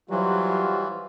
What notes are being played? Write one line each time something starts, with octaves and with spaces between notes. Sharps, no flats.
E3 F#3 G3 F4 F#4 C5